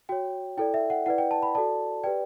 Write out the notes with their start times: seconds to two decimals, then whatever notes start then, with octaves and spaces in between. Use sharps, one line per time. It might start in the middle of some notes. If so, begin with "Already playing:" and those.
0.09 F#4 C#5 G5
0.57 E4 A4 D5 G5
0.74 E5
0.90 F#5
1.06 E4 B4 D5 F#5
1.18 G5
1.31 A5
1.43 B5
1.55 F#4 A4 D5 A5
2.04 G4 B4 D5 G5